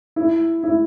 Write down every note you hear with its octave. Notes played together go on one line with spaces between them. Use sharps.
E4
E4